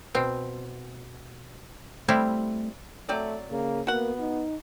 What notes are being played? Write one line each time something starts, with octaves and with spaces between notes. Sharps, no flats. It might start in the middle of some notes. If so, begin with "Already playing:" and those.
B2 C4
G3 A3 C4 E4
F#3 A3 C4 D5
C#3 A#3
A#3 B3 F#4 F#5
D#4